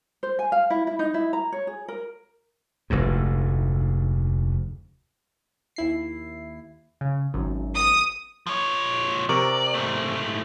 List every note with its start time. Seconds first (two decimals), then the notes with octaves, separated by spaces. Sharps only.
0.23 C5
0.39 G#5
0.52 F5
0.70 E4
0.87 E4
0.99 D#4
1.14 E4
1.33 A#5
1.52 C#5
1.67 G#4
1.88 A#4
2.90 F1 D2 G#2
5.76 D#2 E4 C7
7.01 C#3
7.34 G#1 F#2
7.75 D#6
8.47 F3 C#5
9.29 C3 A#4 D5 C#6
9.74 G#2 A3